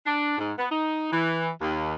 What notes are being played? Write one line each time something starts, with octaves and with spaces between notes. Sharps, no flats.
D4
G#2
B3
D#4
E3
D#2